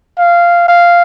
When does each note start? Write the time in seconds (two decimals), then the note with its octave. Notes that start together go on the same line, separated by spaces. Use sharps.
0.18 F5
0.68 F5